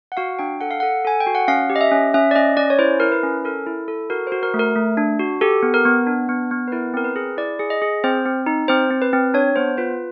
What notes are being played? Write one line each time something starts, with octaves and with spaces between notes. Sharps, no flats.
F#5
F#4 F5
D4 G5
A4 F#5
F5
A4 F#5
A4 G#5
G5
F#4
F#5
C#4 F5
G4
D#5
E5
C#4
C#4 E5
D5
C#4 D#5
C#4 D5
C#5
E4 C5
E4 A#4
B4
C#4
A4 A#4
E4
A4
F#4 A#4
C5
F#4
A#4
A3
A#4
A3
D4
F#4
G4 A4
B3
A#4
B3
D4
B3
B3
B4
E4 A#4
C4 A#4
B4
G#4
E4 D5
G#4
D#5
G#4
C4 C5
C4
D#4
C4 C5
C4
B4
C4
D4 C#5
B3 C5
F4 B4